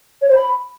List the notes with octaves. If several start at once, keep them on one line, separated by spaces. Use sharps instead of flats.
C#5
C5
B5